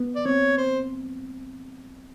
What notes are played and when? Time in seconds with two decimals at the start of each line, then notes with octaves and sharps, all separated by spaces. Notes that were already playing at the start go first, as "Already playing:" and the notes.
Already playing: B3
0.15 D5
0.26 C4 C#5
0.57 C5